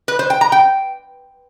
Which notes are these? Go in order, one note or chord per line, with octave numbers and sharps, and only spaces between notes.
B4
C5
G5
A#5
G5